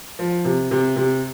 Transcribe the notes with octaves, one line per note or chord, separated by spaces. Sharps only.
F3
C3
C3
C3